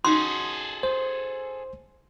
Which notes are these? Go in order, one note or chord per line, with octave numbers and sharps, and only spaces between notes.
C#4 D#4 F#4 G#4 A4 C6
C5